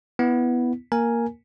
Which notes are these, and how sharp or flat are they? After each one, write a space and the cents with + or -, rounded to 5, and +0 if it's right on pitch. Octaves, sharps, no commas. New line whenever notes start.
B3 +0 E4 +0
A#3 +0 A#4 +0 G#5 +0